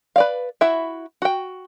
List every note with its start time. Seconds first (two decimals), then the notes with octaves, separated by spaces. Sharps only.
0.16 B4 D5 F5
0.61 E4 F#4 E5
1.22 F#4 G5